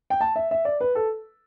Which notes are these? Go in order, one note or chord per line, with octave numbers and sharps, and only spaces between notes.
G5
A5
E5
E5
D5
B4
A4